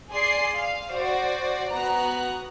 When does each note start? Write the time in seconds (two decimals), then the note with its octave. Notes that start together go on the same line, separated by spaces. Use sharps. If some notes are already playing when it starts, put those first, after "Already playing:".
0.10 G#4 D5 C6 C7
0.58 F5
0.92 F#4 C5 D5
1.72 B3 F#4 A#5 F#6